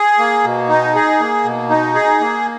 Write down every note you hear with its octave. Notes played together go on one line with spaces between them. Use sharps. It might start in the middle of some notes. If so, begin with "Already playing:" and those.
Already playing: G#4
A#3
B2
D#4
G#4
A#3
B2
D#4
G#4
A#3